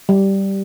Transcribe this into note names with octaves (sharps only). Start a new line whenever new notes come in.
G3